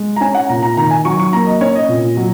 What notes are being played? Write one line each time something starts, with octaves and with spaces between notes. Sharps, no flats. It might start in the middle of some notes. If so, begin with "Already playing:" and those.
Already playing: G#3
A#5
C#4 G#5
F#5
A#2 A#5
A#5
D#3 A#5
G#5
F#3 C#6
C#6
A#3 A#5
D#5
C#4 C#5
D#5
A#2
F#3